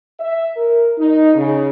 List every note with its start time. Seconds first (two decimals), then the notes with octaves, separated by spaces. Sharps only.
0.20 E5
0.57 A#4
0.98 D#4
1.35 C#3